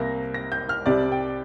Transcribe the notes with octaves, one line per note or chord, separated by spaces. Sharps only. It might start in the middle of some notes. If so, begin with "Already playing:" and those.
Already playing: C2 C3 A#3 A#6
A#6
G6
F6
C2 C3 G3 D5
G5